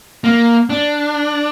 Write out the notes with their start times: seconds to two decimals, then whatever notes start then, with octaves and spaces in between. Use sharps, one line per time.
0.24 A#3
0.70 D4